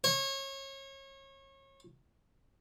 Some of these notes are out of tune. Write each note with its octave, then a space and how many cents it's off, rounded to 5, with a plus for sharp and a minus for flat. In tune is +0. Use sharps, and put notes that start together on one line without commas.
C#5 -30